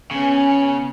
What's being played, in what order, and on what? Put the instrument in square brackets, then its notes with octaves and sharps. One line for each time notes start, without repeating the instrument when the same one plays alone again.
[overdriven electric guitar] C#3 [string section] B3 G#5 C#7 [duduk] C#4